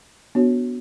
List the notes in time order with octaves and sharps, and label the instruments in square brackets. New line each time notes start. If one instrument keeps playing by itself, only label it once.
[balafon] B3 D4 F#4 C#5